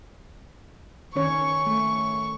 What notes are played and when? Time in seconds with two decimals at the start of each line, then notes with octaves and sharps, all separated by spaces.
1.16 D#3 C#4 C#5 C#6
1.66 A3